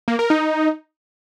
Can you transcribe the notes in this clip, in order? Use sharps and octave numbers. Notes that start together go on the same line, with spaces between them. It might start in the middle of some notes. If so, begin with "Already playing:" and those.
A#3
A#4
D#4